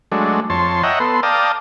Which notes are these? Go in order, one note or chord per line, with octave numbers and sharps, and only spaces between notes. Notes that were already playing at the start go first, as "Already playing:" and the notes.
F#3 G#3 A3 D4
F2 C#5 A5 C6
C#5 D#5 E5 F#5 G5 A#5
B3 A4 C6
D5 F5 G5 A5 A#5 D#6